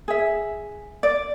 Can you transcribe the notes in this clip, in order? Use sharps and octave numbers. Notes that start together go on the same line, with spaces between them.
G#4 E5
D5